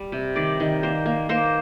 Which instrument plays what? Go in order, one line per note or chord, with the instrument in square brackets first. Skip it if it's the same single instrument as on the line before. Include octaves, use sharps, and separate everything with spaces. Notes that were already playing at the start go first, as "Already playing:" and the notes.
Already playing: [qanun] G3
C3
D#3 D5
D#3
A#3 C5
A#3
A#3 C5